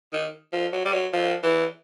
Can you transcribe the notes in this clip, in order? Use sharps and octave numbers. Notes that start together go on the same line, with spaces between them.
D#3
F3
F#3
G3
F#3
F3
E3